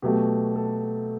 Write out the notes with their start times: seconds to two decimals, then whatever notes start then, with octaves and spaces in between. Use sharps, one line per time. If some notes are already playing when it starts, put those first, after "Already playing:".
0.02 B2 F#3 A3 G4
0.55 A4